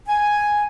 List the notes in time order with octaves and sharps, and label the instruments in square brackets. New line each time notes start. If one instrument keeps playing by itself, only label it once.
[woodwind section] G#5